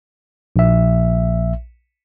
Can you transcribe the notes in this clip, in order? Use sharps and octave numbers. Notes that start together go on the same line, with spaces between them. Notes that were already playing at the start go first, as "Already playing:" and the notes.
A#1 E5